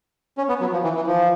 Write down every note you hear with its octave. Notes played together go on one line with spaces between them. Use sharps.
C#4
B3
F#3
F3
E3
E3
F3